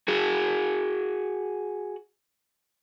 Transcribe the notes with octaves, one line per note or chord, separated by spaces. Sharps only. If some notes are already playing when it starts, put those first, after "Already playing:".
F#4 G#4